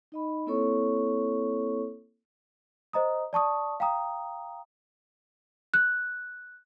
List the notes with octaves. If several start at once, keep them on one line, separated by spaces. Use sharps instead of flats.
D#4 D#5 B5
A#3 C4 E4 A4 C#5 C#6
C5 D#5 A#5 D#6
D5 A5 C#6 D#6
F5 G5 A#5 D#6
F#6